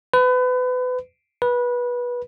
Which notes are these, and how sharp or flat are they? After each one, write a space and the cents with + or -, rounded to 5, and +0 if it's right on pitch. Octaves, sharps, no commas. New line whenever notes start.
B4 +30
B4 -20